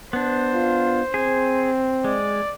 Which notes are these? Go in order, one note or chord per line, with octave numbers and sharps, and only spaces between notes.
B3 D4 C5
F4
C4 G#4
G#3 D5